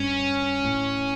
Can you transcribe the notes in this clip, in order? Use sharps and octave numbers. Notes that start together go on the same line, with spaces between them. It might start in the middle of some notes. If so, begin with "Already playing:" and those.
Already playing: G2 C#4
A2